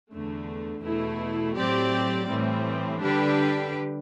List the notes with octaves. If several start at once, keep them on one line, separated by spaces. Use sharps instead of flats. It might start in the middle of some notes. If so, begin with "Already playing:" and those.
E2 D3 A3
E2 B2 A3 E4
A2 F#3 C4 G4 D5
A2 E3 G3 C4
D3 G3 D4 G4 B4